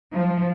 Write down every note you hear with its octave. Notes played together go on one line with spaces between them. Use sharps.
F3